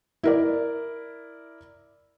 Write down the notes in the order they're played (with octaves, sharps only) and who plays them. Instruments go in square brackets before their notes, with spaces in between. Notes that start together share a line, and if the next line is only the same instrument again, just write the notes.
[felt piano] E4 A#4 D5